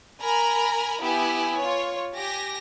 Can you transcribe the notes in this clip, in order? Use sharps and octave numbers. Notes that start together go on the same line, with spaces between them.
A#4 G#5 A#5 B5
B3 E4 G4 G#5
F4 C#5
G4 G#5 A#6